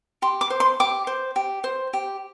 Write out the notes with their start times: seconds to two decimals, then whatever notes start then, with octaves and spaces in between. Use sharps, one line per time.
0.22 G4 C6
0.41 D6
0.50 C5
0.60 C6
0.80 G4 D6
1.07 C5
1.36 G4
1.64 C5
1.93 G4